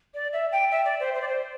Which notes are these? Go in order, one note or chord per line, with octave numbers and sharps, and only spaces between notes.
D5
E5
G5
E5
D5
C5
C5
D5
C5